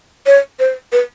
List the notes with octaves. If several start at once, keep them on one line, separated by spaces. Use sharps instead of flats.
C#5
C5
B4